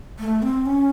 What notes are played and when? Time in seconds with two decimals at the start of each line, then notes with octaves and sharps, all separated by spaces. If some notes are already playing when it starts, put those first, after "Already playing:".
0.19 A3
0.42 C4
0.66 C#4